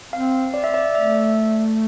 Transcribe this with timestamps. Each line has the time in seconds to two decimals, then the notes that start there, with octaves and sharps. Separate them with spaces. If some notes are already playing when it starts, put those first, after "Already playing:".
0.12 C4 F5
0.54 D5
0.64 E5
0.74 D5
0.95 A3 E5